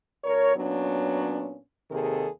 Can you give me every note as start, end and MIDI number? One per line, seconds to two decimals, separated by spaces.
0.24 0.53 38
0.24 0.53 70
0.24 0.53 73
0.55 1.57 46
0.55 1.57 54
0.55 1.57 59
0.55 1.57 61
0.55 1.57 62
1.90 2.27 39
1.90 2.27 48
1.90 2.27 51
1.90 2.27 68
1.90 2.27 69